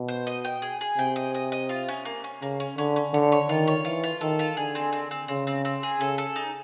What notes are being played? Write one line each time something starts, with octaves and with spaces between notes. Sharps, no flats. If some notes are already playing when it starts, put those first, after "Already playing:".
Already playing: B2
C5
D#5
G5
G#4
G#4
C3 G5
D#5
D#5
D#5
F4
C#4
A#3
C#4
C#3 A#3
C#4
D3 C#4
C#4
D3 C#5
C#5
D#3 F4
C#5
E3 F4
F4
D#3 A4
F4
D3 G#4
C4
C4
C4
C#3 C4
C4
C4
G#4
C#3 A4
A4
D#4